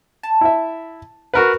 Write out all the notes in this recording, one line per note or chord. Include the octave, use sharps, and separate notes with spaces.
A5
E4 E5
F#4 A#4 B4